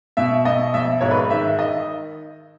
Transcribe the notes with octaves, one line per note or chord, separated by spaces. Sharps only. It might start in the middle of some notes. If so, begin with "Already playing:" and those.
B2 E5
B2 D#5
A#1 E5
G#2 C#5
B4
D#3 E5
D#3 D#5